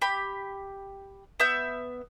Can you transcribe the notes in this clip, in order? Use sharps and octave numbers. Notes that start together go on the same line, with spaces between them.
G4 B5
B3 E5 G6